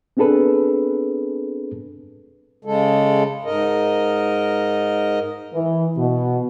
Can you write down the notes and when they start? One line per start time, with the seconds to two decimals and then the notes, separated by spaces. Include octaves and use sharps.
0.17 B3 C4 D4 G#4 A4 B4
2.65 C#3 G#3 A4
3.45 G#2 A#4 D#5
5.52 E3
5.97 B2